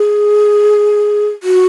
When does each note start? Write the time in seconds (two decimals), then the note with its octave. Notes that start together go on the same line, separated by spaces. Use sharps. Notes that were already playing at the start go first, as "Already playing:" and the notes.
Already playing: G#4
1.43 F#4